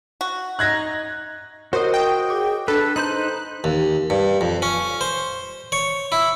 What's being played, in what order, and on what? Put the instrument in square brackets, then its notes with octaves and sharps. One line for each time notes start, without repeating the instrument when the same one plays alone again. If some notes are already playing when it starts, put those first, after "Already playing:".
[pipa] F#4
[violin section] D#4 [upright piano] F#6 G#6 A#6
[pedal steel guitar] F#4 D#5 [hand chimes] A#4 C#5 [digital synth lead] C5
[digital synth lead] G5
[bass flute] G#4 [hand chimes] D6
[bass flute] D4 [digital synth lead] A4 [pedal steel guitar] B4
[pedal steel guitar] D#4 C5 G6 [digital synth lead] F#6
[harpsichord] D#2
G2
F2
C#4
C5
C#5
E4